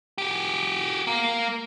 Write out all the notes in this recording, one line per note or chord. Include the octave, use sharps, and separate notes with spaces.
F#4 G4
A#3